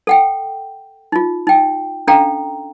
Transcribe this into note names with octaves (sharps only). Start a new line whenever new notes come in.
A4 F#5 G5
D#4 F4
D#4 G5
C#4 D4 A4 F5 G5 A#5